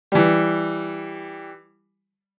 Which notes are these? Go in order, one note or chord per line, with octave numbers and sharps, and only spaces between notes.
E3 G3